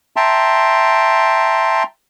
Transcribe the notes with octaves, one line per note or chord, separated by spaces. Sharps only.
E5 G5 A5 A#5 C6